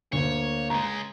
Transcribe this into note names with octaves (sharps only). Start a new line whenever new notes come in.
D2 A#3 C#5
C#2 G#3 A#5